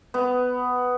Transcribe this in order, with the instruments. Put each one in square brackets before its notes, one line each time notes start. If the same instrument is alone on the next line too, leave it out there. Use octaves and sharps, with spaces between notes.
[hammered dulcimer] B3